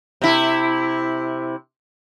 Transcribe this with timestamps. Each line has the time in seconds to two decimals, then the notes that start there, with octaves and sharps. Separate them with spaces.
0.22 C3 E4